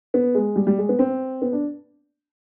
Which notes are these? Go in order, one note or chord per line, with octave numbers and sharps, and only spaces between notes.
B3
G#3
G3
G3
G#3
B3
C4
B3
D4